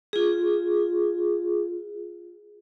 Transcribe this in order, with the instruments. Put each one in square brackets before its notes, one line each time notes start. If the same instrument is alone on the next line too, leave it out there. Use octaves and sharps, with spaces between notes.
[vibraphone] F4 G#4